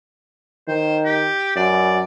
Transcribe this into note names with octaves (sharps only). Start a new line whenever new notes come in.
D#3 C5
G4
F#2 D5